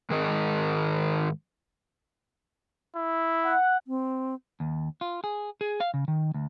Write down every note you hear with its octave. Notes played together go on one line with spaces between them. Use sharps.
G#2 D#3 G#4 A#4 D#5
E4
F#5
C4
D#2
F4
G#4
G#4
F5
C#3
D#3
D2